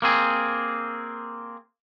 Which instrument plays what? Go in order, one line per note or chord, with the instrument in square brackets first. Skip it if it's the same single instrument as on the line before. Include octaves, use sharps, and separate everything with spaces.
[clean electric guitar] A#3 C4 G#4